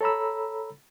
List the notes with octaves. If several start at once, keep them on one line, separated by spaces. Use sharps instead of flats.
A4 C#5 A#5 B5 E6